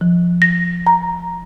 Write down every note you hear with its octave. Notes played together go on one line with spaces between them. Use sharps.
F3
A#6
A#5